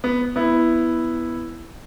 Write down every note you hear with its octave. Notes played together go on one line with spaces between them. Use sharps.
B3
B3 E4